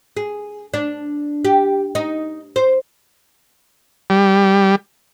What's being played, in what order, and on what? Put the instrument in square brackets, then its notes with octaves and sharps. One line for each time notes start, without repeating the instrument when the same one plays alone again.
[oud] G#4
D4
G4
D#4
C5
[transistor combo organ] G3